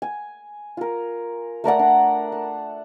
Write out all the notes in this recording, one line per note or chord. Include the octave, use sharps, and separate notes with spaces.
G#5
F4 A#4
A3 A#4 D5 F#5
D4
A5